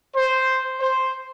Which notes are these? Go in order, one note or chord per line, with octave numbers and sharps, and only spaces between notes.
C5
C5